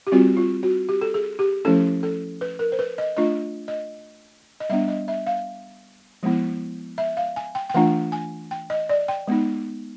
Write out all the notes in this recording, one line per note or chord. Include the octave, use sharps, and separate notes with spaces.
G4
G3 C4 F4 F#4
F4
F#4
G4
A4
G#4
G4
F3 A3 C#4 E4 A4
A4
B4
A#4
C5
B4
D#5
A3 D4 F4 D#5
D#5
D#5
G3 B3 D4 E5
D#5
E5
F5
F3 G#3 B3 E4
E5
F5
G#5
G5
G5
E3 A3 D4 F4 F#5
G#5
G5
D#5
D5
G5
G#3 B3 D#4